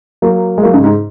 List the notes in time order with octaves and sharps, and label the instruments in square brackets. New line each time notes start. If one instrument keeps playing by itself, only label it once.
[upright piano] F#3 A#3
G#3
F#3 A#3
G#2 C#3
G#2